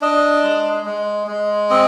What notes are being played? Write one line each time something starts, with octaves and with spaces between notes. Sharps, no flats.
D4 D#5
G#3
G#3
G#3
C4 D#5